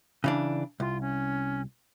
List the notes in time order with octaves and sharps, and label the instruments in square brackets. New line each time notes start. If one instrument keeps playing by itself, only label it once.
[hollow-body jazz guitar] C#3 E3 D4
[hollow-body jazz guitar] C2 [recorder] F4
[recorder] C#4